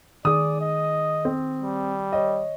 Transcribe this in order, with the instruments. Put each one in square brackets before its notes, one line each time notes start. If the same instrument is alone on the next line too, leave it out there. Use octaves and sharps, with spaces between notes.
[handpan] D#3 G#4 [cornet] D5 [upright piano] D#6
[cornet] D#5
[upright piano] C4
[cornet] G3
[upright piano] C#5 D#5